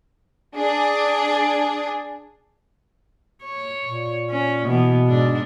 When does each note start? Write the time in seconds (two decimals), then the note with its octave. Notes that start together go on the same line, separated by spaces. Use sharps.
0.57 D4 G#4
3.43 C#5
3.85 A#2
4.30 C#4
4.66 B2 E3 B3
5.08 G#2 D4